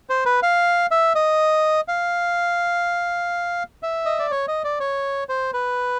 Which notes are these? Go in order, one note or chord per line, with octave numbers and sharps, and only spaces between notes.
C5
B4
F5
E5
D#5
F5
E5
D#5
D5
C#5
D#5
D5
C#5
C5
B4